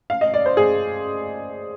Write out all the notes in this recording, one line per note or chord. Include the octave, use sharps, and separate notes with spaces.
F5
D#5
D5
C5
G#4